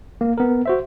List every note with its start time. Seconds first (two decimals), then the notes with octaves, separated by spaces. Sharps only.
0.21 A#3
0.38 B3 A#4
0.66 F#4 C5 E5